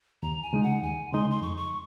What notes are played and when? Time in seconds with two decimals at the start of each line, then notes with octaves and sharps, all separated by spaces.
0.23 D#2 A#5
0.43 G#5
0.53 C#3 G#3 D#4
0.63 F#5
0.83 D#2 G#5
1.12 C#3 G#3 D#4 C6
1.31 C6
1.42 F2 C#6
1.57 C#6